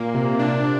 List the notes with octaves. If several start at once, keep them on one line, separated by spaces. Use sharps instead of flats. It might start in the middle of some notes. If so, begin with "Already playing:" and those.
Already playing: A#2 A#3
C3
D4